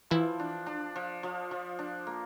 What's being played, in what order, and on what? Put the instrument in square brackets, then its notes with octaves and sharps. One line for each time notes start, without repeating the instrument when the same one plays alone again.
[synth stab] E3 E4 [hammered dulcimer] F3
[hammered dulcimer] D4
D4
F3
F3
F3
D4
A#3